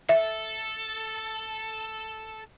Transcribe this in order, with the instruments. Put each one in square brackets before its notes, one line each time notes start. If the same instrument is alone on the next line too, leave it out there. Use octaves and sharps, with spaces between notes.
[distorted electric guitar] A4 [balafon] E5